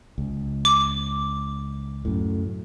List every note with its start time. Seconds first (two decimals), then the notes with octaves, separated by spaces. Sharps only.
0.18 C#2
0.65 D6
2.05 F#2 A2